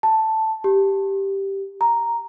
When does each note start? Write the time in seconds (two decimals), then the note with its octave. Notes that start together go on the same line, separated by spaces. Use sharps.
0.03 A5
0.64 G4
1.81 A#5